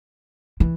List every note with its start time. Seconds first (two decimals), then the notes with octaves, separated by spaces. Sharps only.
0.60 E3